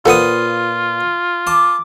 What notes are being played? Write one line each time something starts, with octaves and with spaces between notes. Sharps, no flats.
A#2 F4 A4 B4 C5 F#5 D#6
A5 D6